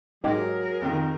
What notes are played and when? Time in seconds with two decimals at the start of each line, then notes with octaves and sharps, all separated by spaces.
0.24 G#2 F#3 G#3 G4 G#4 A#4
0.82 F2 D#3